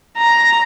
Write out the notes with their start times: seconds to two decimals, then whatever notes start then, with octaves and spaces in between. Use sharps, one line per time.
0.18 A#5